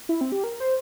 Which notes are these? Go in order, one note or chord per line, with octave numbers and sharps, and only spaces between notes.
E4
C4
G4
A#4
C5